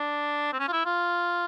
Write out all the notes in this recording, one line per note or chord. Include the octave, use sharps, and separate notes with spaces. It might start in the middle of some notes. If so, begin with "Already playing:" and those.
Already playing: D4
C4
C#4
F4
E4
F4